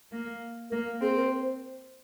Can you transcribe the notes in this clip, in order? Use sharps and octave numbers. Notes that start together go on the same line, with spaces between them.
A#3
A#3 A#4
C4 G#4
A#4
C5